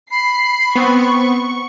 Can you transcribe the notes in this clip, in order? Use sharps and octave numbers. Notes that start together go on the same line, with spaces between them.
B5 C7
B3 C4 C#6